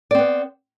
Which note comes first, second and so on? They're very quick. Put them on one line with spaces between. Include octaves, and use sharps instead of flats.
D5 C4 B3